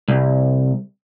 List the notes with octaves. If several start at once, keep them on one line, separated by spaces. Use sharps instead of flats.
C2